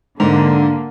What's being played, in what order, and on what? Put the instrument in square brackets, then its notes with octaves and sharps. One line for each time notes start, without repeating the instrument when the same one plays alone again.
[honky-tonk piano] G#2 [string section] D3 A#3 [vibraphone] D4